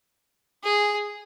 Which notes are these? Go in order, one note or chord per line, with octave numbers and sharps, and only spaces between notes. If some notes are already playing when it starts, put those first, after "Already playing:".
G#4